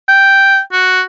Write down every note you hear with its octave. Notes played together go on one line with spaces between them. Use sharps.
G5
F#4